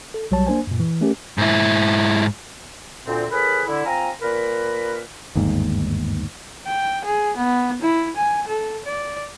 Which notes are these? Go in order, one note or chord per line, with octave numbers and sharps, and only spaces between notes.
A4
B1 F#3 G3 C#5 A5
A#3 D4 C5 G#5
F#2 A#2
E3
A3 C#4 G4 A#4
G#2 E4
D2 A#2 C4
A2 G#4 A#4 B4 B5
D3 E4
C4 F4 G#5 A#5
A#2 A#4 B4
G1 D#2 G#2
G5
G#4
B3
E4
G#5
A4
D5